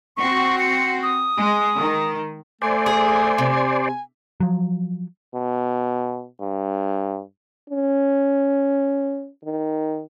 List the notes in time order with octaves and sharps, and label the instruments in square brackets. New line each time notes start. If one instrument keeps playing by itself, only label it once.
[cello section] C4 F#4 [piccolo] C#6
[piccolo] C#7
D#6
[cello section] G#3
D#3
[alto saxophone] A3 [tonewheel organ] C5 D5 [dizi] G#5
[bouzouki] G#4
C3
[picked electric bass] F3 F#3
[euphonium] B2
G2
[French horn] C#4
D#3